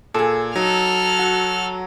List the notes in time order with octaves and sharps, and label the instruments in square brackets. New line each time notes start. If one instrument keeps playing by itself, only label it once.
[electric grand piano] A#2 [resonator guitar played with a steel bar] G#4 A4
[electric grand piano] F#3 [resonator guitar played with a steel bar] D#4 [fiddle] A4 F6
[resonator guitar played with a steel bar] F#4